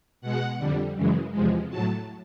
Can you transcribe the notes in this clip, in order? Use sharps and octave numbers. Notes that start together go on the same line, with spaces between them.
B2 G#3 F#5
F2 D3 G3
F#2 C#3 E3 G#3
E2 C3 F3 G#3
A2 F#3 A5